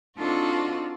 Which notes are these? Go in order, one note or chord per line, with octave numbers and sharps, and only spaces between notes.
C4 D4 D#4 F4 F#4 A4